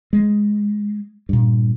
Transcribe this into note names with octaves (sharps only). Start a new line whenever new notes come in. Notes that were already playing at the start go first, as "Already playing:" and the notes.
G#3
G2 A#2